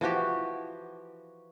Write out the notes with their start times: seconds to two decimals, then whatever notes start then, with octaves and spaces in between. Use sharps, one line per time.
0.01 E3 F3 F#4 G4